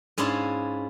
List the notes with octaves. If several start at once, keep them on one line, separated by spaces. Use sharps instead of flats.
G#2 C#4 D4 E4 F4 C6